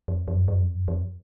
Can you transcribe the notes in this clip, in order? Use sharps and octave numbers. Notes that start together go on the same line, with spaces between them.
F2
F2
F#2
F#2
F2
F#2
F2